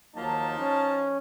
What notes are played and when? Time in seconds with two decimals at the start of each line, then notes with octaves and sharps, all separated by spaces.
0.15 D#2 F3 F#3 A#3 D#4 A5
0.59 C#4